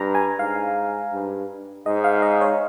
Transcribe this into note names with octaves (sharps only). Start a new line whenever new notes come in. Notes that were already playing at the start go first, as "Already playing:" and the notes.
Already playing: G2 A#5
G#5
G#2 F5
G2
G#2 D#5
F5
D#5
C#5